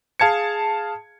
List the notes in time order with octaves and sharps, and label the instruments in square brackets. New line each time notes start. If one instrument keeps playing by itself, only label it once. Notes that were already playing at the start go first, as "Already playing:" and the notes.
[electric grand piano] G#4 F5 A5 G#6 C#7